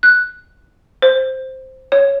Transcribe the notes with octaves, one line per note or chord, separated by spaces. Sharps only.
F#6
C5
C#5